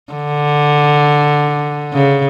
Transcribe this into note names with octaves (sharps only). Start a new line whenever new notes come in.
D3
C#3